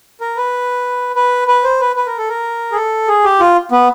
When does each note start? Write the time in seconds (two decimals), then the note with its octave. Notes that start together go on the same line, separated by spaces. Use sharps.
0.21 A#4
0.37 B4
1.16 B4
1.48 B4
1.64 C5
1.80 B4
1.96 B4
2.07 A#4
2.18 A4
2.29 A#4
2.72 G#4
2.75 A4
3.08 G#4
3.24 G4
3.40 F4
3.72 B3